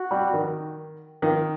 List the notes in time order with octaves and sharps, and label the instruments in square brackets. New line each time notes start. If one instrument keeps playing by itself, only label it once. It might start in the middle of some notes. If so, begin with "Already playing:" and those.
Already playing: [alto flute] F#4
[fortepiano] G3
D#3
[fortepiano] D#3 [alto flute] F4